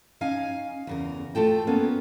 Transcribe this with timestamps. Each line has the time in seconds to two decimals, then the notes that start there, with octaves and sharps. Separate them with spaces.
0.21 C#4 D#4 F5 G#5
0.87 E2 C#3 A#4
1.35 A3 F4 A4 G5
1.67 A#3 B3 C#4